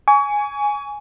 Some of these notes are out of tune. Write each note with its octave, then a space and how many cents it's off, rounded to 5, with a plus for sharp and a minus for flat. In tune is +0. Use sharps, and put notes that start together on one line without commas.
G#5 +0 C#6 +35